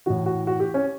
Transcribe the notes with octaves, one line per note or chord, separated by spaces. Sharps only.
A2 E3 F#4
F#4
F#4
G4
C#4